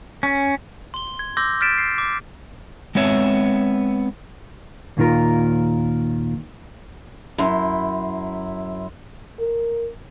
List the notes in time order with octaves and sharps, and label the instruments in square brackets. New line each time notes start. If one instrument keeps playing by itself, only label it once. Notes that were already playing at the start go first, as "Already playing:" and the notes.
[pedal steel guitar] C#4
[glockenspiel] C6 G7
G#6
C6 D6 E6 G6 A#6
F6 G6 A6 B6 D7 E7
C7
D6
[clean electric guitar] G#3 B3 C4 C#5 E5
D#2 A#2 D#3 F4 A#4
[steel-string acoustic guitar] F#2 [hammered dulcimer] E4 C6
[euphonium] A#4